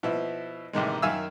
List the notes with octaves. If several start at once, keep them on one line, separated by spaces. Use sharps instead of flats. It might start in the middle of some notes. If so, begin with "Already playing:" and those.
B2 F3 E4
A1 C3 D#3 G#3
F#2 D#3 E5 F5 G#5 E6